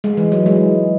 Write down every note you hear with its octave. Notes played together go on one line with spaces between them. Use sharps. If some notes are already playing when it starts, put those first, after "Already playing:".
G#3
E3
F#3
G#3